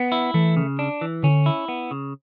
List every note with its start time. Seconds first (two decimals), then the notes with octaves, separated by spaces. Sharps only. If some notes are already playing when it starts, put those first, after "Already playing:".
Already playing: B3
0.12 E4
0.34 E3 A3
0.57 C#3
0.79 D4
1.01 E3
1.23 D3 C#4
1.46 E4
1.68 B3
1.91 C#3